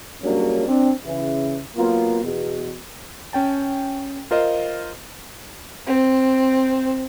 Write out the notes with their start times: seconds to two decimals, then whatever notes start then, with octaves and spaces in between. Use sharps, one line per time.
0.23 E2 G2 F#3 A#3 C#4 D4
0.67 C4 D4
1.05 C#3 E3 E4
1.76 F#3 A#3 B3 F4
2.23 E2 B2
3.33 C#4 G5 A5
4.31 F4 A#4 C5 D#5 F5
5.86 C4